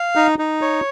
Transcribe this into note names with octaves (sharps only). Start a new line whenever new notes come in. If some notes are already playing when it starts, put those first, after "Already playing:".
Already playing: F5
D#4
D#4
C#5